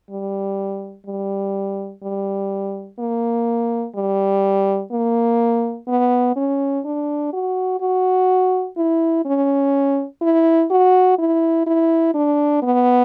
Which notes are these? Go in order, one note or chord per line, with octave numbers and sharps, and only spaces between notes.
G3
G3
G3
A#3
G3
A#3
B3
C#4
D4
F#4
F#4
E4
C#4
E4
F#4
E4
E4
D4
B3